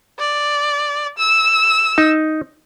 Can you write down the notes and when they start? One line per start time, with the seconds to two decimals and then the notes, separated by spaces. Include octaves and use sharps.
0.19 D5
1.18 E6
1.98 D#4